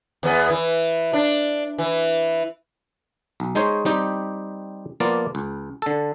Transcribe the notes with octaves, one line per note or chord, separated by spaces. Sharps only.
E2 B3
E3
D4
E3
B1
G#3 D#4 G#4 C5 C#5
G3 C4 D#4 G4
F3 A#3 B3 F4 D5
C#2
D3 A4